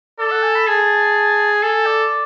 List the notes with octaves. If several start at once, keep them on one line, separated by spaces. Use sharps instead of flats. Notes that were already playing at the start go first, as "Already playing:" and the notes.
A4 D5
F#5
G#5
B5
G#4 A5
A4 G#5
D5